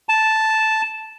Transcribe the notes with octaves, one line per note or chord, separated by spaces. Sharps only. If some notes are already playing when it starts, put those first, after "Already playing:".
A5